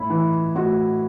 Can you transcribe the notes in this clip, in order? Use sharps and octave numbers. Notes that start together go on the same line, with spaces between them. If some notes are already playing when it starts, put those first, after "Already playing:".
Already playing: A2 E4
E3
A2 F#4